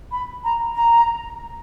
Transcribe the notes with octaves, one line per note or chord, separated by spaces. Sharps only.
B5
A#5
A#5